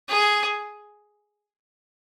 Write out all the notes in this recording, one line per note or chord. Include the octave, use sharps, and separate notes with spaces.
G#4